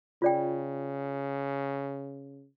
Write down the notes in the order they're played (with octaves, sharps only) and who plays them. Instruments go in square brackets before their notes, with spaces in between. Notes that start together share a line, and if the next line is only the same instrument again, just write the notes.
[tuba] C#3 [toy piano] F4 D5 G5